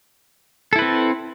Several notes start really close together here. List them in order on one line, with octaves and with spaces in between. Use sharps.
A4 E4 B4 C4